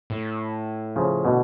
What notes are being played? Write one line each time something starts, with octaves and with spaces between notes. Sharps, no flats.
A2
C#3 F3
B2 D3